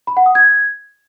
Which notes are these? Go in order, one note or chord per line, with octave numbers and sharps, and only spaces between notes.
B5
F#5
D#6
G#6